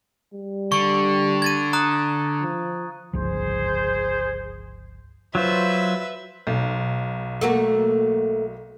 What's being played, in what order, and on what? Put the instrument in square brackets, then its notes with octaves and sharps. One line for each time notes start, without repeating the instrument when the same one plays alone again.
[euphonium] G3
[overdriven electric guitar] D3 [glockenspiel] C#6
[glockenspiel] G#6 A6 D#7
A#5 D#6 F#6
[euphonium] F3
[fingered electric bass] G1 C#2 F3 [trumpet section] G#4 C5
[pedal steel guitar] F#3 F4 C5 [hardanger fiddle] B4 E5
[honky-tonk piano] B1
[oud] A3 A#3 F#4